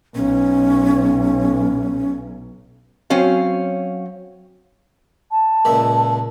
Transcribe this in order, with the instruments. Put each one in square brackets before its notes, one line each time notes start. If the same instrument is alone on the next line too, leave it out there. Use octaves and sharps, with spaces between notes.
[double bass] B1 [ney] C#4
[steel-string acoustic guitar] F#3 C4 C#4 F5
[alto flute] A5
[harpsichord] C#2 A#2 E5